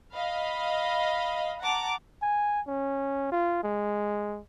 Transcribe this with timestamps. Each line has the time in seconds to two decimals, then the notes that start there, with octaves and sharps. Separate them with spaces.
0.14 D#5 F5 B5
1.62 F#5 A5 A#5 D6
2.22 G#5
2.68 C#4
3.32 F4
3.63 G#3